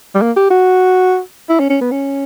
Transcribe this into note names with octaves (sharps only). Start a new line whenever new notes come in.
G3
A#3
G4
F#4
E4
C#4
C#4
B3
C#4